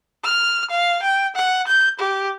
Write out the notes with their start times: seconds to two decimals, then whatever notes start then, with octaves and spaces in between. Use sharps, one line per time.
0.24 F6
0.70 F5
1.03 G5
1.36 F#5
1.67 G6
1.99 G4